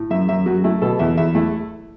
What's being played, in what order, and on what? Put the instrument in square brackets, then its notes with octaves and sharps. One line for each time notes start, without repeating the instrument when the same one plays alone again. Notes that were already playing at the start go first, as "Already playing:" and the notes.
Already playing: [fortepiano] A2
F#2 E5
F#2 E5
F#2 F#4
A3 E4
B2 A4
E2 E5
E2 E5
A3 E4